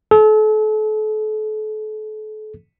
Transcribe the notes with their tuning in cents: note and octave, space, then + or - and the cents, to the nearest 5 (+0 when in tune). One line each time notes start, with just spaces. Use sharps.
A4 -35